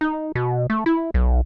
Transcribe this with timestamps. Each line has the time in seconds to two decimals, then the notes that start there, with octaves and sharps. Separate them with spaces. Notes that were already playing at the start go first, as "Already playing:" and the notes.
0.01 D#4
0.35 B2
0.70 A3
0.86 E4
1.14 B1